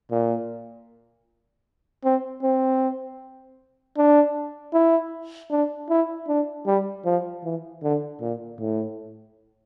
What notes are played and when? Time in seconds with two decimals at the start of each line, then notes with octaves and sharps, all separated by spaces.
0.11 A#2
2.05 C4
2.43 C4
3.97 D4
4.74 E4
5.51 D4
5.90 E4
6.28 D4
6.67 G3
7.05 F3
7.44 E3
7.83 D3
8.21 A#2
8.60 A2